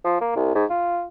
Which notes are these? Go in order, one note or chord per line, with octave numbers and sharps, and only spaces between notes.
F3
A#3
C2
G#2
F4